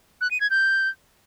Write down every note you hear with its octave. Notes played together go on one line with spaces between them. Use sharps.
F#6
D#7
G#6
G6